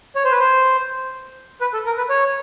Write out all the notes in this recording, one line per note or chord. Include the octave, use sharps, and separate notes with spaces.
C#5
C5
B4
C5
B4
A4
A#4
B4
C#5